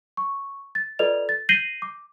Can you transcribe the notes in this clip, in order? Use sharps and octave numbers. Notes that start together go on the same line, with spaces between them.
C#6
A6
F4 A4 B4 D5 D#5 F7
A6
G6 A#6 C7 D#7 F#7 G7
D6